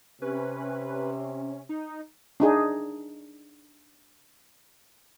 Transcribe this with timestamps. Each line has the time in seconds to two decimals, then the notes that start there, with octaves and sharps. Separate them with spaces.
0.22 C3 C#4 B4
1.69 D#4
2.40 D4 D#4 G#4